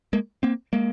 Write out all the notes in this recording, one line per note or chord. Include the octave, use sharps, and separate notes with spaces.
G#3 A#3
A#3 C4
G#3 A#3